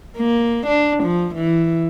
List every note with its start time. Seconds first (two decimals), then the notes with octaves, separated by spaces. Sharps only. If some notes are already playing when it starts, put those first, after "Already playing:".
0.17 A#3
0.67 D4
1.04 F3
1.35 E3